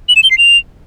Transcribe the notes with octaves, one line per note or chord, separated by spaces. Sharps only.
F#7
E7
G7
C7
F7